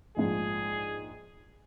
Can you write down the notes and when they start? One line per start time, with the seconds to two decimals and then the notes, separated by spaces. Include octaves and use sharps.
0.17 A#1 G#2 F3 G#4